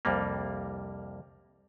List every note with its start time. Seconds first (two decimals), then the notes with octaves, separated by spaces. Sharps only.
0.05 C2 F2 G3 A#3